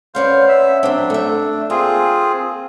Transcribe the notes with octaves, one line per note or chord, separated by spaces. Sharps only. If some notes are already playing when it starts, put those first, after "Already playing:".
B3 C#4 C5 D5 F5
E5
F#3 C4 D4
A3 E5
A#3 C4 F4 G#4